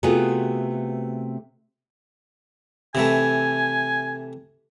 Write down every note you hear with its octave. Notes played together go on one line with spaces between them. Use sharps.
C3 A3 B3 F4 F#4 G#4
C3 E3 A3 G#5